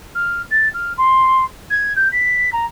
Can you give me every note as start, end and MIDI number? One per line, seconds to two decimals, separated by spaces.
0.15 0.42 89
0.50 0.68 93
0.74 0.93 89
0.97 1.44 84
1.70 1.92 92
1.96 2.08 91
2.11 2.50 95
2.52 2.65 82